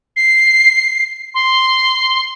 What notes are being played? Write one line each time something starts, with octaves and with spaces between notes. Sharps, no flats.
C7
C6